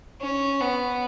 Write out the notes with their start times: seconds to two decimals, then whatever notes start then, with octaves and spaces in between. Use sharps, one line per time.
0.20 C#4
0.60 B3